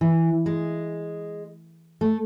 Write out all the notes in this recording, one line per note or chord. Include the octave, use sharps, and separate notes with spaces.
E3
G#3
A3